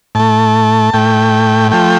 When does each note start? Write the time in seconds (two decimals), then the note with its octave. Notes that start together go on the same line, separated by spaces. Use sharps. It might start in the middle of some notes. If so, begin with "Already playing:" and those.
0.15 A2 A3 A5
0.94 A2 A3 G5
1.71 F3 A3 G5